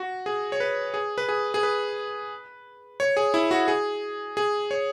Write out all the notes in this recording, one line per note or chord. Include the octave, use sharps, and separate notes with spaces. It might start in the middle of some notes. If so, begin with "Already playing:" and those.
Already playing: F#4
G#4
C#5
B4
G#4
B4
G#4
G#4
B4
C#5
G#4
E4
F#4
G#4
G#4
C#5